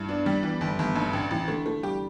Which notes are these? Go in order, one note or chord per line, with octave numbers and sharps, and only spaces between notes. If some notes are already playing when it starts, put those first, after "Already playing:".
Already playing: G2 E4
B3 D4
G3
E3 B3
G1
G1 G3
G2
A1 D3
A1 E3
D3 A3
E3 A3
G3 G4